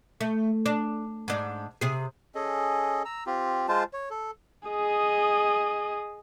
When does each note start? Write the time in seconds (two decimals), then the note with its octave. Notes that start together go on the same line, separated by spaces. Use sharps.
0.21 A3
0.66 D4
1.28 G#2 D4
1.81 C3 G#4
2.35 C#4 G#4 A4 D#5
3.05 A#5 E6
3.26 C4 F4 G4
3.68 G#3 F4 C5 A5
3.93 C#5
4.11 A4
4.68 G#4 D#5